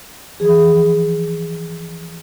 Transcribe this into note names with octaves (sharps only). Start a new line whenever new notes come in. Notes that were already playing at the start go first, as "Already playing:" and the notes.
E3 F3 G#4